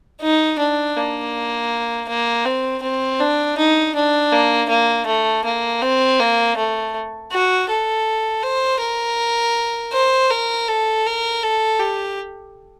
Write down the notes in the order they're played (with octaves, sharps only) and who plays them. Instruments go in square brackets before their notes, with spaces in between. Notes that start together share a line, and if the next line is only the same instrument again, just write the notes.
[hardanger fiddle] D#4
D4
A#3
A#3
C4
C4
D4
D#4
D4
A#3
A#3
A3
A#3
C4
A#3
A3
F#4
A4
C5
A#4
C5
A#4
A4
A#4
A4
G4